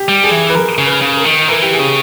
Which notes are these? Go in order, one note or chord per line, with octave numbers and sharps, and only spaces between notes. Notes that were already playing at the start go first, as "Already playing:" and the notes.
Already playing: G4
G3
G#4
E3
B4
A#4
C#3
B4
C#3
A#4
D#3
E3 A#4
G4
G#4
C#3